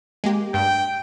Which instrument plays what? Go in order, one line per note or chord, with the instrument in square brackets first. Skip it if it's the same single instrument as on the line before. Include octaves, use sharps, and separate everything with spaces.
[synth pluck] G#3 A#3 G4
[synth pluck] G2 [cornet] G5